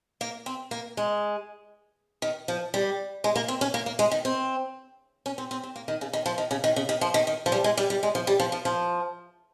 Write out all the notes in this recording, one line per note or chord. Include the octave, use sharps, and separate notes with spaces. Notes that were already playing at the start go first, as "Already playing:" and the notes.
A#3
C4
A#3
G#3
D#3
F3
G3
G#3
A#3
C4
C#4
A#3
A#3
G#3
D#3
C4
C#4
C4
C4
C4
A#3
D#3
C#3
D#3
F3
D#3
C#3
D#3
C#3
D#3
F3
D#3
D#3
F3
G3
G#3
G3
G3
G#3
F3
G3
F3
F3
F3